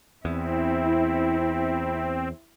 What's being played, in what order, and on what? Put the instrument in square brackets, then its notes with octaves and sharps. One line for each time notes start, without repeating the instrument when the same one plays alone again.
[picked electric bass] E2 [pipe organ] C4 [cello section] E4